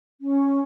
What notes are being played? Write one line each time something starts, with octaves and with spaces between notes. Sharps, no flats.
C#4